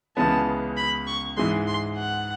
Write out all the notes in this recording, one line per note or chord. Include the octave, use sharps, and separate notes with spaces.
C#2 C#3 E3 G#3 B3 A5
B5
C#6
G#2 E3 G#3 C6
C6
F#5